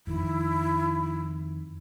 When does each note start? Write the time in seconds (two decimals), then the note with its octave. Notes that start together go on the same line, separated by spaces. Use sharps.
0.07 F2 D#3 E4